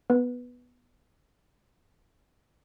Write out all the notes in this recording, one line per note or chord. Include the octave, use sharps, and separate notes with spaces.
B3 B4